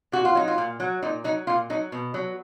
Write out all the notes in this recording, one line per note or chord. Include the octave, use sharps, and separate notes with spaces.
A#2 F#4
F4
F#3 D#4
F4
A#2
F#3
A#2 D#4
F#3 D#4
A#2 F4
F#3 D#4
B2
F#3